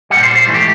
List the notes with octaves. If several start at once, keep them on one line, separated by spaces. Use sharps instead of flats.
A#2 G3 F#5
C5
C5
G#2 E3 A3
G4